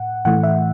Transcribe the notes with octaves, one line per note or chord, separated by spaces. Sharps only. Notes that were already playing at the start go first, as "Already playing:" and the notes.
Already playing: A2 F#5
A2 E3 A3 F#5
E5